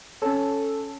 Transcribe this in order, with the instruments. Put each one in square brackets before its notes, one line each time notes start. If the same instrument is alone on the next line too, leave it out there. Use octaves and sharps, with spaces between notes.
[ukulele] C#4 C#5 [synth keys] A4